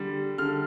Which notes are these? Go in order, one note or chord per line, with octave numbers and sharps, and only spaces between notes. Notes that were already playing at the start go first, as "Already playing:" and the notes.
Already playing: D3 G3
D3 F6